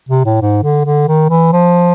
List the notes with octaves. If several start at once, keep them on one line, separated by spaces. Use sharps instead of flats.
C3
A2
G#2
D3
D3
D#3
E3
F3